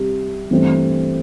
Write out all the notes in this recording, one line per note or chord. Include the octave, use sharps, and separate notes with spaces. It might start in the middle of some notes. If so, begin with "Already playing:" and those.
Already playing: C3 G3
G2 E3 A3 C4